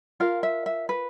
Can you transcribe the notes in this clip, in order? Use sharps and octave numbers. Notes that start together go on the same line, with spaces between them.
F4 A#4 F5
E5
E5
B4